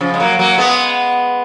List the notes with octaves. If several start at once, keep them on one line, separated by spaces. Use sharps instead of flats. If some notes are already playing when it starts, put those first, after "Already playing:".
C#3 F3
G#3
F#3 A#3
F#3 A#3
G#3 B3